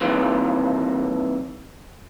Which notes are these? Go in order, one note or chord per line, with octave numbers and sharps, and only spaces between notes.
G2 C3 D#3 E3 A#3